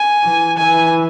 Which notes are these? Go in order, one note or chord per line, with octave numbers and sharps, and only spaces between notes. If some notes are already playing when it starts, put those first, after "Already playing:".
Already playing: G#5
E3
E3 G#5